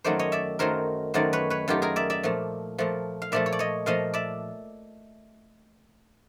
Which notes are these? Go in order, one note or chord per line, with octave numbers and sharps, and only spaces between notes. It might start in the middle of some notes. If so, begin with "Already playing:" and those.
F#2 D#3 F#3 A3 C5 D5
C#5 D#5
D5 E5
F#2 D#3 F#3 A3 A#4 C5
F#2 D#3 F#3 A3 C5 D5
B4 C#5
B4 C#5
F#2 D#3 F#3 A3 F4 G4
G#4 A#4
D5 E5
D5 E5
A#2 F3 A3
A#2 F3 A3
F5
A#2 F3 A3 D5 E5
C#5
D5
C#5 D#5
A#2 F3 A3 D#5 F5
D5 E5